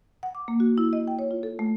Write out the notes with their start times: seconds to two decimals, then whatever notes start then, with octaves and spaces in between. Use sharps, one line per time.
0.23 F#5
0.35 D6
0.48 A#3
0.60 F#4
0.78 E4
0.93 D#5
1.07 G5
1.19 C#5
1.31 F4
1.43 A4
1.59 A3